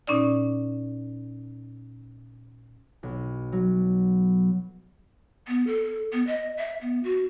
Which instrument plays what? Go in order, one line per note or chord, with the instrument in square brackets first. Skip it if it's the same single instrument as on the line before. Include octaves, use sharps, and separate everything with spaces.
[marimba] A#2 C#4 D#4 D5
[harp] B1
F#3
[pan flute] B3
A4
B3
D#5
E5
B3
F#4